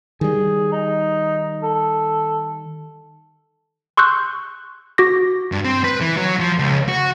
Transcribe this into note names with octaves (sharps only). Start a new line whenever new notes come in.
D#3 G3 G#4
D#4
A4
C6 C#6 E6 F#6 G6
F#4 D6 A#6
G2
C4
B4
E3
F#3
F3
C#2
F#4